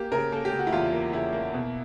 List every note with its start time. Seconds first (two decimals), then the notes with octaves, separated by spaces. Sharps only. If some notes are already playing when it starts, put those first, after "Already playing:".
Already playing: A#3 G4
0.12 C#3 A#4
0.32 A#3 A4
0.45 G4
0.52 C#3
0.59 F#4
0.67 E4
0.72 E2 F4
0.92 A#3
1.13 C#3 E4
1.32 A#3
1.53 B2